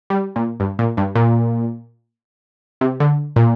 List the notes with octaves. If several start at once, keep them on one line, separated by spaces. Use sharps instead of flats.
G3
A#2
G2
A#2
G2
A#2
C3
D3
A#2